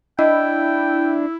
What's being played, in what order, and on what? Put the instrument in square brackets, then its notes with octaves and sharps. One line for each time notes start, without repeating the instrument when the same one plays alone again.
[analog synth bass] D4 [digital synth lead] E4 [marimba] D#5 [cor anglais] G5